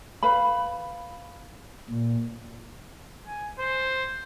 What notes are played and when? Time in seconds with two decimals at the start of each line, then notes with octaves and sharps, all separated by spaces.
0.23 B4 F5 B5
1.90 A#2
3.27 G#5
3.59 C5